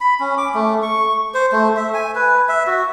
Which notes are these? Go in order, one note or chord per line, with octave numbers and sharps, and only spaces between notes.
B5
C#4
D6
A3
C#6
C5
A3
E5
G#5
B4
E5
F#4